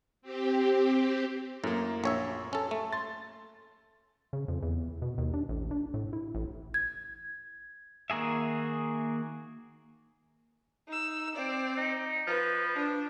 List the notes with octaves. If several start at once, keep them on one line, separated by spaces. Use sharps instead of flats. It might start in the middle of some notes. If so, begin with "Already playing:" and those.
C4 G4
F#2 A2 A#3
A#1 C#5 E5
C#4 A4
A3
C6 A6
C#3
F2
E2
B2
D#2
D4
A1
D4
A2
E4
A1
G#6
D#3 A#3 F#4 G#4 E5
D#4 E6
C4 D5
D#4
F3 B4
D4